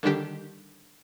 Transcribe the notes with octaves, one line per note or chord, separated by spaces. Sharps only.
D3 D#3 G3 D4 G4